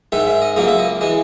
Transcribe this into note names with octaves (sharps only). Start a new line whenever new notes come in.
G#2 D#3 G#3 E5
E5
D#5
C#2 C#3 F#3 A#3 D#5
E5
D#5
E3 G#3 D#5